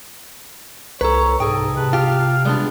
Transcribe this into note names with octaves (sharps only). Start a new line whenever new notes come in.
C2 A4 B4 C#5 A#5
C2 G#2 G#4 A4 D#5 G5
C3 B4 A5
F4 G4 F5
G3 G#3 B3 D4